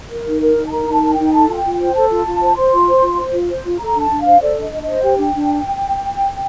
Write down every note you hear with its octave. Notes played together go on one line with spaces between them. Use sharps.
A#4
D#4
A#4
D#4
A5
A#4 A#5
D#4
A5
A#4
D#4 G5
A4 A5
F4
G5
F4
C5 G5
A4 A5
F4
F4
C5
C5 C6
F4
C5
F4
C5
F4
C5
F4
A4 A#5
D4
A5
D4
C5 F5
A4 D5
D4
D#5
D4
D#5
C5
G4 G5
D4
D4